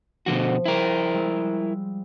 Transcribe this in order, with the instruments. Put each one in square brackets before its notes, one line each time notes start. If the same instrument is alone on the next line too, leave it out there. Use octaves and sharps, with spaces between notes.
[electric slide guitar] B2 D3 F#4 [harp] F3
[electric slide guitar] E4 A#4 [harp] G#4 G5 C6
[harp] G3 G#3 E6